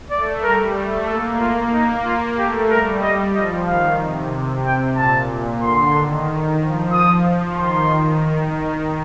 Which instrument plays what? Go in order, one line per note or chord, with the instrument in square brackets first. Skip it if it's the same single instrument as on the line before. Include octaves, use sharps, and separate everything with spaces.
[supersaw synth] A3 [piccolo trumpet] D5
[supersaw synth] G3 [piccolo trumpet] A#4
[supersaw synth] A3
[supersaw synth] A#3 [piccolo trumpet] A4
[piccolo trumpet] F4
[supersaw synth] A#3 [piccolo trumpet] D#4
[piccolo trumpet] F4
[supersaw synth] A3 [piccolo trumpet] G4
[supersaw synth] G3 [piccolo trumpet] A#4
[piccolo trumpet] D#5
[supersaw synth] F3 [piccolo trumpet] D#5
[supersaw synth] D#3 [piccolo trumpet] F5
[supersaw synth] C3
C3
[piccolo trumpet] G5
[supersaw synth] A#2 [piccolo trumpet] A5
[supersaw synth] D3 [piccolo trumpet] C6
[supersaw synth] D#3
F3
[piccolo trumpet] D#6
[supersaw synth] F3
[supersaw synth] D#3 [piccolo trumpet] C6
[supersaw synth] D#3